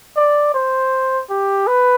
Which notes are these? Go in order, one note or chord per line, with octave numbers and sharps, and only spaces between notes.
D5
C5
G4
B4